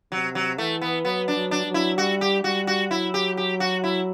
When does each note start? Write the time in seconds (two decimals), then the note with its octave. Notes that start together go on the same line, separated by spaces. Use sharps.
0.12 C3 F#3
0.35 F#3
0.58 E3 A3
0.82 B3
1.05 F#3 B3
1.28 D4
1.36 F#3
1.51 D4
1.66 F#3
1.74 E4
1.98 G3 F#4
2.21 G4
2.44 G3 F#4
2.67 F#4
2.91 F#3 E4
3.14 G4
3.37 G4
3.60 F#4
3.84 E4